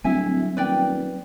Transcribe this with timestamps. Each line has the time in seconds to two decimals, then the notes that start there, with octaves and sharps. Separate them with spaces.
0.04 D1 F#3 G3 C4 E4 E5 G#5
0.57 D#1 B4 D5 G5